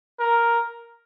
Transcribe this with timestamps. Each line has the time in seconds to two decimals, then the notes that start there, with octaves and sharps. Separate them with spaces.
0.20 A#4